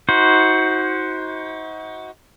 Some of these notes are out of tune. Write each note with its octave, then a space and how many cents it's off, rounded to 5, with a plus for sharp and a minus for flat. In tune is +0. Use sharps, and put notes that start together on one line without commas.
D#4 +40 F#4 +0 C5 +0